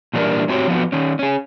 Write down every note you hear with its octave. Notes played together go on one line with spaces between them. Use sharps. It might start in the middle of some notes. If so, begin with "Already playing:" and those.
A#2 E3 G3 D4 A#4
A2 C4 D4 F#4 G4 C#5
F3 F#3 B3 F#4
D#3 C#4
C#4 G#4